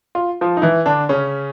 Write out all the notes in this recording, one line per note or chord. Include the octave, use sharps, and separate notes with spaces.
F4
F3 F4
D#4
E3 E4
D3 D4
C#3 C#4